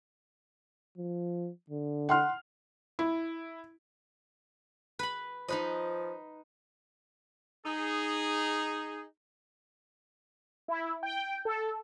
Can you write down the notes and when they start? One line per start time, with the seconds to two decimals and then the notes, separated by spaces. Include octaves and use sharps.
0.98 F3
1.70 D3
2.09 F#5 C6 F6
2.99 E4
4.99 B4 B5
5.48 F3 D#4 B4 D#5
7.66 D#4 G#4
10.68 E4
11.03 G5
11.45 A4